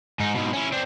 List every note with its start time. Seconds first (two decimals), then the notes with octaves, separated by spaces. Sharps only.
0.19 G#2 D#4
0.35 G#2 B2
0.53 C#4 E4
0.72 C4 D4